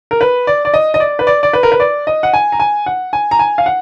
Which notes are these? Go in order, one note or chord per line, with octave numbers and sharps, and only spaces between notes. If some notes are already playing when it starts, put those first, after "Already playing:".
A#4
B4
D5
D5
D#5
D#5
D5
B4
D5
D5
B4
A#4
B4
D5
D#5
F#5
G#5
A#5
G#5
F#5
G#5
A#5
G#5
F5
F#5